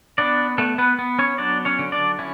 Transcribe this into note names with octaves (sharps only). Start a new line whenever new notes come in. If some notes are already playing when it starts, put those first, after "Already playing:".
B3 D4 D5
A3 B3 A4
B3 B4
B3
C#4 C#5
F#3 D4 D5
C#4 C#5
D3
D4 D5
C#4 E4